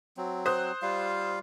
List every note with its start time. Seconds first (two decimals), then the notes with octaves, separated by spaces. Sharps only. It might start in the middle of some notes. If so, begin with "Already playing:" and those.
0.17 F#3 C4
0.46 C5 D#6 F#6
0.82 G3 F4 F5